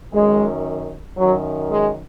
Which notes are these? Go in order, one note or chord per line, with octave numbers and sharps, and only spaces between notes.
F#2 D#3 G#3
F#2 D#3 F#3
G#3